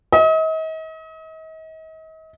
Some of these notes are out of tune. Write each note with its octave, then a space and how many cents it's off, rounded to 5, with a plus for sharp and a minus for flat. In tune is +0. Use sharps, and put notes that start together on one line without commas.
D#5 +40